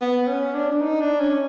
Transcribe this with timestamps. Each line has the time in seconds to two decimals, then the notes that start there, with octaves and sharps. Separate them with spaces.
0.01 B3
0.28 C#4
0.55 D4
0.72 D4
0.81 D#4
1.01 D4
1.20 C#4